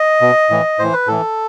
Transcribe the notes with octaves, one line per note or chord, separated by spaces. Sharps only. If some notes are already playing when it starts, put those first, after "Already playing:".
Already playing: D#5
B2
A2 E3
A2 E3 C5
B4
A2 E3 A4